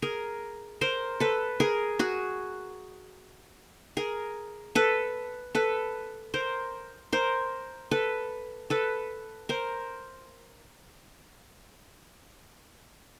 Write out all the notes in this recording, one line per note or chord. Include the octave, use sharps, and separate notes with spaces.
G#4 A#4
A#4 C5
A4 B4
G#4 A#4
F#4 G#4
G#4 A#4
A4 B4
A4 B4
A#4 C5
A#4 C5
A4 B4
A4 B4
A#4 C5